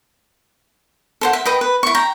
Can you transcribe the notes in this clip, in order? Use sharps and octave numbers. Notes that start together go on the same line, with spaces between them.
A4 C5 F#5
E5
B4 D#5 G5
B4
E4 C#6
G5 A#5